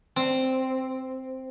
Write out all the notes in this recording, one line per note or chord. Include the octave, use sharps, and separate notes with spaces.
C4